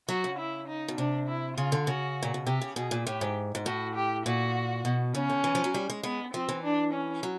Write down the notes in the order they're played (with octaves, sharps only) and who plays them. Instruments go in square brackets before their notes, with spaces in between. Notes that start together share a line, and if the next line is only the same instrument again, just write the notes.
[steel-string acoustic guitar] F#3 [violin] F#4
[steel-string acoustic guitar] C#3
[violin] E4
D#4
[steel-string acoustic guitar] B2
[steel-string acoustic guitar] C3 [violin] D4
[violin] E4
[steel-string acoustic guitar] C#3 [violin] F4
[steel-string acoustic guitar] D3
[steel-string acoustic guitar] C#3 [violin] F#4
[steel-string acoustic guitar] A#2
B2
[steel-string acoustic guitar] C3 [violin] G4
[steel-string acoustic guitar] C#3
[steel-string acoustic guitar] B2 [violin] G#4
[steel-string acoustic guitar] A#2
[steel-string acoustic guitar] A2 [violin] G4
[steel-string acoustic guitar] G#2
G#2
[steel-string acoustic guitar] A2 [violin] F#4
[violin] G4
[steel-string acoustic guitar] A#2 [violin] F#4
[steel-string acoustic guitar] B2
[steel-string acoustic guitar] C#3 [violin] C#4
[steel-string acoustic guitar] D3
E3
F3
F#3
G3
G#3
[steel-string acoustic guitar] G#3 [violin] B3
[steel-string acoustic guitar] F3 [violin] C4
[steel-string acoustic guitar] E3
[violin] D4
C#4
[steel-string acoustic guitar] F#3